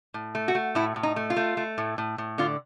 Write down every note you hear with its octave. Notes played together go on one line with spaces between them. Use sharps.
A2
A3
F#4
A3
A2 E4
A2
D#4
A3
F4
A3
A3
A2
A2
A2
D3 F4